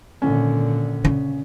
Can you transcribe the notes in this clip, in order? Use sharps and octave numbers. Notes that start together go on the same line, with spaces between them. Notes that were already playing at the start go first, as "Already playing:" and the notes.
G#1 A#2 D3 C#4
C#3